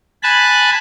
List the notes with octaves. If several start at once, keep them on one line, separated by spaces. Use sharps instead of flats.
G#5 A5 B5 F#6